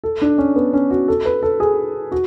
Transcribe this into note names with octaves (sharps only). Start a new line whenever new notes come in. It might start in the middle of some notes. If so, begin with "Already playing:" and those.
A4
D4
C#4
B3
C#4
F#4
A4
B4
A4
G#4
F#4